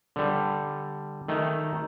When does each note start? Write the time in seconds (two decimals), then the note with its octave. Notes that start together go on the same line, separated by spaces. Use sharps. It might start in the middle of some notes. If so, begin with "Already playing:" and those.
0.16 D3 G3
1.28 D#3 A3